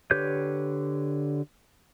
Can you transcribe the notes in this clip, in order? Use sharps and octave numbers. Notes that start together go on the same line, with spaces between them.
D3 G4 B4 C#5 G6